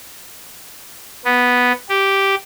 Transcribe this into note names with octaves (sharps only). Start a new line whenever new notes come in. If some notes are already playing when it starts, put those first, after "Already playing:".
B3
G4